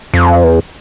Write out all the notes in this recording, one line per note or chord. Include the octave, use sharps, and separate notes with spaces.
F2
E2